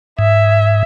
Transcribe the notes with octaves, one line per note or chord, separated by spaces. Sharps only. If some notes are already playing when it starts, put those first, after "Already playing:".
G#2 E5